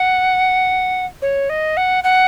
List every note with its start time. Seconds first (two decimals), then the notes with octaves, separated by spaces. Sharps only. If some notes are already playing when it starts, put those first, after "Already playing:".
Already playing: F#5
1.22 C#5
1.49 D#5
1.77 F#5
2.04 F#5